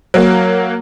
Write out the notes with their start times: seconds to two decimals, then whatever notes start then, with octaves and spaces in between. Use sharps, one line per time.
0.14 F#3 A#3